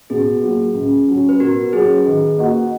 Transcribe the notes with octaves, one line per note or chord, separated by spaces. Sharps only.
B2 G#4
F#3 A#3
C#2
C#3 F#3 C#4
B4
B2 F#4 A#4
F#3 C#4 G#4 B4
D#3
A#3 D#4 F#4